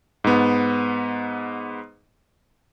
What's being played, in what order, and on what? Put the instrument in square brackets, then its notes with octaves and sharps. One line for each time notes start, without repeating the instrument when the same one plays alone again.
[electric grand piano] G#2 B3